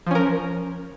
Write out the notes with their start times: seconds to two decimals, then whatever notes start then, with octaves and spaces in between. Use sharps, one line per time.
0.07 F3
0.11 C#4
0.15 A#4